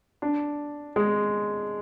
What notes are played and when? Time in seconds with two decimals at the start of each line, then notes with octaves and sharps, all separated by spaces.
0.22 D4
0.96 G#3